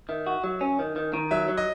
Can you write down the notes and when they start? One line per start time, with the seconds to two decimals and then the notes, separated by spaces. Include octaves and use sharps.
0.09 D#3 E5
0.27 F#4
0.44 F#3
0.61 C#4
0.79 D#3
0.96 D#3
1.14 D#3
1.31 F#3 E5
1.48 F#3
1.57 D#5